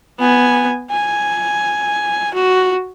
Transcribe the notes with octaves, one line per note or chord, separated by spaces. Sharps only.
B3 G#5
G#5
F#4